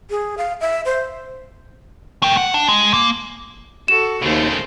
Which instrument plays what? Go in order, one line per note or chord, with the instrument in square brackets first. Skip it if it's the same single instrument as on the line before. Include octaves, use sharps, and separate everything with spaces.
[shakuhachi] G#4
F5
E5
C5
[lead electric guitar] A3 G5
F#5
D4
G#3
A#3
[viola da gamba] F#4 A4 [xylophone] E7
[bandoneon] D#2 [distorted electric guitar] C#3 A3 [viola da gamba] C5